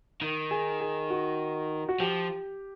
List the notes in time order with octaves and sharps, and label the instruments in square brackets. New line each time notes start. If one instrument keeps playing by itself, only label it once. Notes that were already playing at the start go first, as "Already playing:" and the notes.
[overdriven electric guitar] D#3
[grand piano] G#4
G#4
F#4
F#4
[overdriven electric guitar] F3 [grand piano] G4